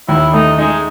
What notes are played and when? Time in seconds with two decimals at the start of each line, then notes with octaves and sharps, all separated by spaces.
0.08 D#2 E4
0.33 A3 D#4
0.58 G#3 D#4